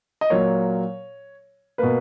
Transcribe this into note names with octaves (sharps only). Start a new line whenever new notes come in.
D#5
A#2 F#3 A#3 C#5
B2 A#3 B4